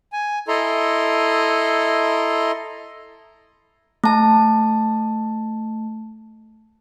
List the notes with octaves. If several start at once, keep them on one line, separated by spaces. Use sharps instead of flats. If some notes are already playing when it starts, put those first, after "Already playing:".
G#5
E4 A4 D#5 A#5 C6
A3 A5